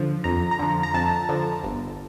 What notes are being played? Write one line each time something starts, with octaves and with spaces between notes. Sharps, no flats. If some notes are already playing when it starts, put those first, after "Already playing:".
Already playing: D3 F3
F2 A#5
A#5
D3 F3
A#5
F2 A5
D3 F3
G1